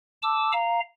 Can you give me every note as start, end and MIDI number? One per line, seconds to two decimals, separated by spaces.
0.22 0.52 81
0.22 0.52 86
0.22 0.52 88
0.52 0.80 77
0.52 0.80 82